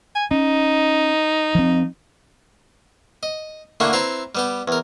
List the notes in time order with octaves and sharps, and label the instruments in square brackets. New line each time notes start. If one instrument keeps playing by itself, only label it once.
[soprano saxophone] G#5
[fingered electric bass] C#4 [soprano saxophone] D#4
[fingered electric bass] F3 C4
[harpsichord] D#5
D3 A3 A#3 D4 E4 F#4
C4 E4 B4 A#5 C6
G3 B3 G4
E2 A#4